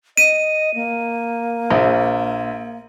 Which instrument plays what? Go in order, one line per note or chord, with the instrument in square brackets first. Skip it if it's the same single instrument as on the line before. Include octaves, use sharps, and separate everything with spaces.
[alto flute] D#5 [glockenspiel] D#7
[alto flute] A#3
[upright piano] A#1